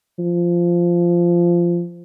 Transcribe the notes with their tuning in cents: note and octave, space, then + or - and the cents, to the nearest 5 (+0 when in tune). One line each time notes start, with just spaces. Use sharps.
F3 -10